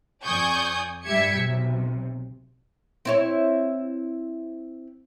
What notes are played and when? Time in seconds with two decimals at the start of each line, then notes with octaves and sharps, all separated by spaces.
0.24 F2 D5 G#5 C#6 D#6 G6
1.05 G2 G3 G4 E5 G#6 C#7
1.35 B1 C3
3.05 C4 E4 C#5